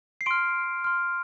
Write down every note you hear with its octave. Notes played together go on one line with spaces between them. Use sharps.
C7
C6 F6 D7
C6 F6